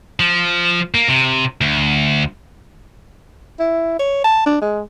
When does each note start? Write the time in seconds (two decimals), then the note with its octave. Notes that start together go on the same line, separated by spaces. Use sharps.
0.20 F3
0.94 A#3
1.09 C3
1.61 D2
3.59 E4
3.99 C#5
4.24 A5
4.46 D4
4.62 G#3